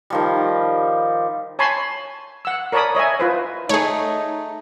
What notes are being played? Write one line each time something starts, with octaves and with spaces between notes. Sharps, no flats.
D#3 F3 G3
C#5 G#5 A5 B5 C6
F#5 E6
A#4 C#5 D5 A5 B5 D#6
C#5 D#5 E5 G#5
F4 B4 C5
A3 D#4 G#4 C#5